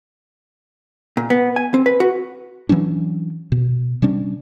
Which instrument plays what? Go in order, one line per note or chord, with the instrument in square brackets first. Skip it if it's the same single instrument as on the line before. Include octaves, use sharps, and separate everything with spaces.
[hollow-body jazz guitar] A#2
B3
G#5
C4
B4
F#4
[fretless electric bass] E3 F#3 C#4 D4
B2
C3 G3 C#4 D4